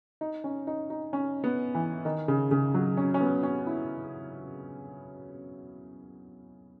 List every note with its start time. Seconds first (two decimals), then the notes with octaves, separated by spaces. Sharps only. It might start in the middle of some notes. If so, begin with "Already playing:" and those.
0.21 D#4
0.44 C#4
0.67 D#4
0.90 D#4
1.13 C#4
1.44 B3
1.75 E3
2.05 D#3
2.28 C#3
2.51 C#3
2.74 F#3
2.97 C#4
3.14 C#4
3.21 B3
3.43 C#4
3.67 E4